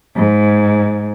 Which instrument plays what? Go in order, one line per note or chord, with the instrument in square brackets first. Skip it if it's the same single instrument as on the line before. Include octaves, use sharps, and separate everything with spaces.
[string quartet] G#2